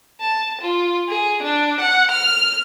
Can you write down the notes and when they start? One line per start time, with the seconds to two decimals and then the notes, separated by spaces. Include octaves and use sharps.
0.21 A5
0.62 F4
1.09 G#4
1.43 D4
1.81 F#5
2.11 F6